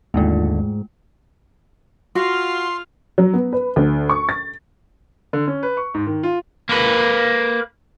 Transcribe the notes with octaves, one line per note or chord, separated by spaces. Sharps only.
G#1 D#2 G#2 D3 G#3 A3 F4
F4 F#4 F5 C6
F#3
B3
B4
D2
C#6
A6
D3
C#4
B4
C#6
G#2
D#3
F4
A#3 B4